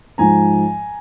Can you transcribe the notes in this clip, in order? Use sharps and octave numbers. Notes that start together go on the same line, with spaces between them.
G#2 F3 G#3 G#5 A#5